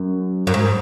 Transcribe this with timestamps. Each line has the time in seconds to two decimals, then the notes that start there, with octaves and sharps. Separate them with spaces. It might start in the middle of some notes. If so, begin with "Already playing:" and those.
Already playing: F#2
0.47 F#2
0.54 G#2